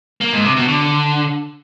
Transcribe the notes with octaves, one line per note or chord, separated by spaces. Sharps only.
A#3
G#2
C3
B2
D3